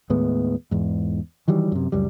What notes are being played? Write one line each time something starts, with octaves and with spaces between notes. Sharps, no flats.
D#2 A2 G#3 B3
E2 G#2
D#3 E3 F#3 G3
F#2 C3
C#2 F#2 G3